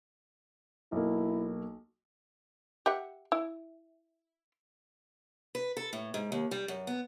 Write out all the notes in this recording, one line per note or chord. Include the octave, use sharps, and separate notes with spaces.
B1 A#3 E4
G4 E5 F#5
E4
B4
A4
A2
G#2
D#2
G3
F#2
B3